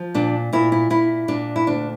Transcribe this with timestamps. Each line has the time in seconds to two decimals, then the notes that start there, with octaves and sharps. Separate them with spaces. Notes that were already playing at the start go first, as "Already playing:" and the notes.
Already playing: F3
0.14 A#2 D4
0.53 A#2 E4
0.72 E4
0.90 A#2 E4
1.28 A#2 D4
1.56 E4
1.67 D2 D4